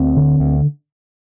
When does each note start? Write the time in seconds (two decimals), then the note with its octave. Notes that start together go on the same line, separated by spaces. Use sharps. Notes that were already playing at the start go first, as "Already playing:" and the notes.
Already playing: D2 C4
0.16 D3
0.40 D2